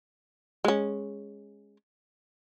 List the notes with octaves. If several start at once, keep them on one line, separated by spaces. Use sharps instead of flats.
G#3 C#4